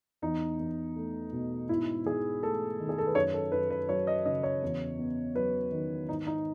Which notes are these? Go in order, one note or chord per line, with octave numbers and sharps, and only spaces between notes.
E2 D#4
E2
A3
B2
G#2 E4
G#2 G#4
A3 A4
D#3
G#4
A4
B4
F#2 C#5
A4
F#2 B4
B4
F#3 C#5
D#5
C#3 D#5
C#5
E2
B3
F#3 B4
D#3
G#2 D#4
D#4